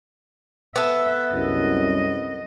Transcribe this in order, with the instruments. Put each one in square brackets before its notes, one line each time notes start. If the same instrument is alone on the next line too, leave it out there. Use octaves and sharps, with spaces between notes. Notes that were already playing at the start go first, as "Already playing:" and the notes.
[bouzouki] B3 A4 [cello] E5
[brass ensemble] C2 F#2 [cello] D#5